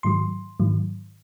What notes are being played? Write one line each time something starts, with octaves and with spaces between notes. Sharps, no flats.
G#2 D#3 F#3 C6
G#2 D#3 F#3